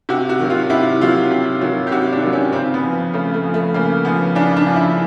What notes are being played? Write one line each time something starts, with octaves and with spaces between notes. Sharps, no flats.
C3 F#4
F#4
D#3 F#3
F4
C3 E4
D#3 F#3 F4
C3
D#3 F#3
G4
C3 F#4
D4
D#3 F#3
C#4
C#3 C4
B3
F3
C#3 A3
A3
F3
A3
C#3 A#3
F3 B3
C#3 D4
D4
F3
E4